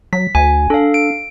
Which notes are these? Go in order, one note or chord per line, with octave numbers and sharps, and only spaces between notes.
F#3 B6
D2 G#5
D4 A4 F5
D7